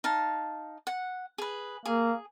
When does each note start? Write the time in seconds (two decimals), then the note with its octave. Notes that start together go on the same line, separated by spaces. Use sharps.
0.04 D#4 F5 A5
0.87 F#5
1.38 G#4 B4
1.86 A#3 G#4